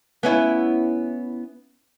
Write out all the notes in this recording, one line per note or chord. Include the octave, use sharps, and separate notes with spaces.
B3 C#4 E4